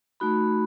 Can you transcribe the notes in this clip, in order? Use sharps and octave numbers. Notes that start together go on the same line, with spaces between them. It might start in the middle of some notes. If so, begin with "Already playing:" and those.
A3 D#4 F#4 B5